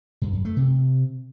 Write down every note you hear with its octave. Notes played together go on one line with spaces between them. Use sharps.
G2
F#2
A3
C3